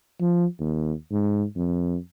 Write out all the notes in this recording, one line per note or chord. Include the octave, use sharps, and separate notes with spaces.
F3
D#2
G#2
F2